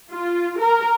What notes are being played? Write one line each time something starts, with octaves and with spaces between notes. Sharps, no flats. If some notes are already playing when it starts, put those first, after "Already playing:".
F4
A#4